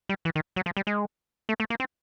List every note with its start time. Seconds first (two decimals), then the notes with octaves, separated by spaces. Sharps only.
0.09 G3
0.25 E3
0.35 D#3
0.56 F#3
0.66 F3
0.77 G3
0.87 G#3
1.49 A3
1.60 A3
1.70 A#3
1.80 C4